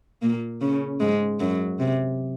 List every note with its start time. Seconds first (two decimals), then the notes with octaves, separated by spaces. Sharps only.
0.22 A#2 A#3
0.61 C#3 C#4
1.01 G#2 G#3
1.40 F#2 F#3
1.80 C3